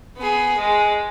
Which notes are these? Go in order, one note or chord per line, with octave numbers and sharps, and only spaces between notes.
B3 G#4
G#3